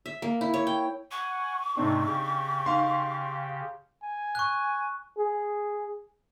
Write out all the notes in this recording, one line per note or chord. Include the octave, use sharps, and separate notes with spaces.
E5
A#3
E4
C#5
G5
F#5 G#5 C#6
G#2 C3 A3 C4 D4 D#4
C#3 G4
D#4 F5 C6
G#5
C#6 F#6
G#4